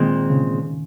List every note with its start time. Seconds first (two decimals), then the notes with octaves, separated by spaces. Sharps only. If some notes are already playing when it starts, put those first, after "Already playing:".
Already playing: A#2 D#3 G#3 C4
0.30 C#3